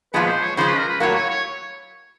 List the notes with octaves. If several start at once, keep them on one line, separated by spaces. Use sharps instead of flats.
A#2 F3 G#3 B3 B4
C5
C#5
C#3 F3 G#3 C5
B4
A#4
B4
A2 F#3 A#3 C#5
C#5
C#5